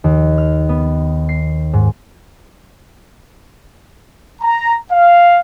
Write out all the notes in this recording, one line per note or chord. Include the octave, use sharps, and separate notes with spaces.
D#2
F6
B3
C7
G#2
A#5
F5